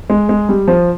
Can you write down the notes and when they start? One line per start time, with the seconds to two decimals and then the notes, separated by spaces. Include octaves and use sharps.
0.10 G#3
0.29 G#3
0.49 G3
0.68 F3